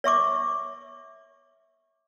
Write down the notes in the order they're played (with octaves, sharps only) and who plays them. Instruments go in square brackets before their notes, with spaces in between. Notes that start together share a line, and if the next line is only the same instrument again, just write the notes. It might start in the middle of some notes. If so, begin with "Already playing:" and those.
[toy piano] C#5 E5 C#6 D6